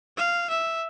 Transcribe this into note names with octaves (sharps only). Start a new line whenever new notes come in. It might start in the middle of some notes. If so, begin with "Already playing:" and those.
F5
E5